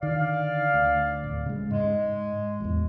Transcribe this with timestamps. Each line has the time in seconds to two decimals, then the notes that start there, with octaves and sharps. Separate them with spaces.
0.02 D3 D#3 D5 F5
0.74 D2
1.24 D1
1.46 C#3 G#3
1.71 G#2 G#3
2.60 A1 E2